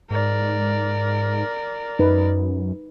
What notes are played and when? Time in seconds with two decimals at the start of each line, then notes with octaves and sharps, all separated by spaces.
0.11 G#2 A#4 D5
1.99 F#2 D#4 B4